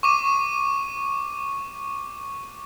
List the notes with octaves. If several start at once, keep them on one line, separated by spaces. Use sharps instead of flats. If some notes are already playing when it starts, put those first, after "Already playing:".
C#6 D6 D#7